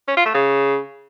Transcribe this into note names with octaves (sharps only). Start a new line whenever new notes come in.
C#4
F4
A3
C#3